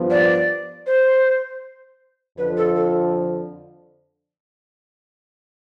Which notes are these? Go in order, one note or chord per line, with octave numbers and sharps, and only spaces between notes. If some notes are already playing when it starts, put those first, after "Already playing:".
Already playing: G2 F3 B3
D5
C5
F2 D3 F3 B4
A4
A4